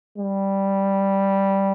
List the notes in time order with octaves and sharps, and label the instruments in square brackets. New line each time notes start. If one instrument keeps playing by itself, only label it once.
[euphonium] G3